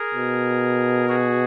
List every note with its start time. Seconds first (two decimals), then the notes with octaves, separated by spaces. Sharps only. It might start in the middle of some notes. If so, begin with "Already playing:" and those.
Already playing: G#4 A#4
0.15 B2
1.09 F#4 G#4